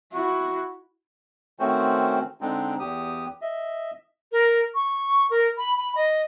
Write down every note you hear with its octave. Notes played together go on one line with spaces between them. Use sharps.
E4 F#4
D#3 A3 C4 C#4 F#4 C5
D3 G#3 C4 D4 D#4
E2 G4 D#6
D#5 E5
A#4
C#6
A#4
B5
B5
D#5